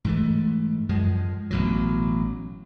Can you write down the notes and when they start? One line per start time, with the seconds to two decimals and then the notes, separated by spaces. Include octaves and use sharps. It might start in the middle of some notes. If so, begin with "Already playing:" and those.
0.05 G#2 E3 A3
0.89 F#2 F3 G#3
1.51 A1 B2 F#3